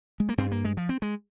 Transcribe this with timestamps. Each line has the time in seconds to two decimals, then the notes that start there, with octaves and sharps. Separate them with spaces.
0.20 G#3
0.29 A#3
0.38 G2 C4
0.52 A#3
0.65 G#3
0.77 F3
0.89 C4
1.02 G#3